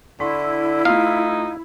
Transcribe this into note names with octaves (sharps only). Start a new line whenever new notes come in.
D3 E4 C6 C#6 B6
A3 D#4 F4 F5